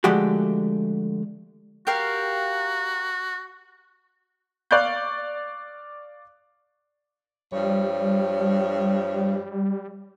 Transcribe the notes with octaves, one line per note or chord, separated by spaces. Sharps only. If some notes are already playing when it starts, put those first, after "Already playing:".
D3 F3 G#3 A3 F#4 G4
F#4 G4 A#4 F5
D5 F5 C#6 F#6 G6
G2 F3 G3 C#5